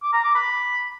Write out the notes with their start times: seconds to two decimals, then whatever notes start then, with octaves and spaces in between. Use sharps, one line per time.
0.02 D6
0.13 A#5
0.24 D6
0.35 B5